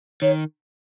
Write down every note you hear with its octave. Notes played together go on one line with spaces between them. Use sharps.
D#3 C#5